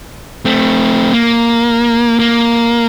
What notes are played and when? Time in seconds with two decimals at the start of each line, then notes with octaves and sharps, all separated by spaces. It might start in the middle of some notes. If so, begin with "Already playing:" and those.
0.45 A3 C4
1.13 A#3
2.19 A#3